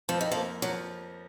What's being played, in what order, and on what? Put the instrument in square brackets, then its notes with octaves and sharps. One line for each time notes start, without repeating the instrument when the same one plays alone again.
[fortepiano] F2 [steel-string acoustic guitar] F3
[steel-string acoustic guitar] D#3
[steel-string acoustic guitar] F3 [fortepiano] A#3
[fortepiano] F3 [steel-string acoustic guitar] F#3